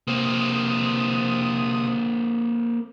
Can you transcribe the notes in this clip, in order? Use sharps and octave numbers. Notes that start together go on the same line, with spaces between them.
C3 A#3 C4 D#6